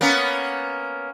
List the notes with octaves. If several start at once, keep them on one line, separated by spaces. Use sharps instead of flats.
A#3 B3 C#4